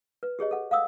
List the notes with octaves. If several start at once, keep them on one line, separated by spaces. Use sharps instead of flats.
B4
G4 G#4 C#5 D#5
A4 F#5
F5 F#5 D#6 E6